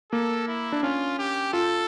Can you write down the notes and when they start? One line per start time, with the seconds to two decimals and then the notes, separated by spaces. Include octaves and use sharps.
0.12 A#3 A4
0.48 E4
0.72 D4
0.83 C#4 F4
1.19 G4
1.53 F4 A4